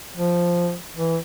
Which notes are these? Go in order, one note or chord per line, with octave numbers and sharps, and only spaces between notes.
F3
E3